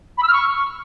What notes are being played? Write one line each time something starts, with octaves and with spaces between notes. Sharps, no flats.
B5
E6
F6
C#6